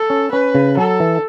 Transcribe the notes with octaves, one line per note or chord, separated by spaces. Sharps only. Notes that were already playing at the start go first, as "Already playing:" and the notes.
Already playing: A4
C#4
C#4 B4
C#3
F#3 A4
E3